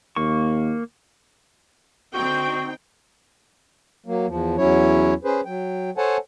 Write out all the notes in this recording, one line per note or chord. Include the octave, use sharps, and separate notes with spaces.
D#2 A#3 C#6
D3 C4 D#4 F#4 G5
F#3 A#3
E2 F3
E2 F#3 C#4 E4 C#5
C#4 G#4 B4 C5
F#3 G5
A4 C5 C#5 F#5 G#5 A5